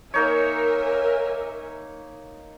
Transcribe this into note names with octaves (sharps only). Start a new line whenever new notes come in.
A#3 D#4 A#4 C#5 E5 G#5